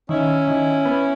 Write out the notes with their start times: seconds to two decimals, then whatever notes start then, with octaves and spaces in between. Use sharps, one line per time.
0.09 D#3 C#4 E4
0.48 D#3
0.85 B3